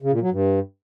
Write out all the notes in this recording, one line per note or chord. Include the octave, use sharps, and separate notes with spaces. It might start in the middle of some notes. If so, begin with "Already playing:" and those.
C#3
A#2
F#3
G2